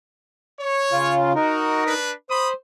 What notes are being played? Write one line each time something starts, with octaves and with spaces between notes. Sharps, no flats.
C#5
C#3 F4
D#4 F#4 A#4
D4 B4
C5 B5 D#6